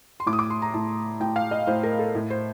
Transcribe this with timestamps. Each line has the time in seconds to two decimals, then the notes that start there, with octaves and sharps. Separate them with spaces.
0.20 C6
0.26 A2 D6
0.33 D#6
0.39 D6
0.50 C6
0.62 A#5
0.74 A2 A5
1.20 A2 G5
1.36 F5
1.51 D#5
1.67 A2 C5
1.83 A#4
1.99 A4
2.15 A2
2.30 C5